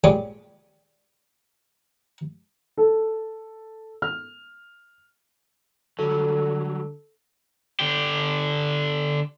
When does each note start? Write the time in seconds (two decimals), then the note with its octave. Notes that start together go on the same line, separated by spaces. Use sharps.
0.04 A#2 G3 G#3 C#5 D6 D#6
2.77 A4
4.02 F6
5.99 D3 F#3 G3 A4
7.80 D3 G4